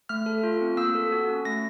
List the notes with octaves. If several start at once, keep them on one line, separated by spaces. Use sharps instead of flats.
A3 F6
A4
F4
C4
A#3 E6
A4
F#4
C#4
A3 A#6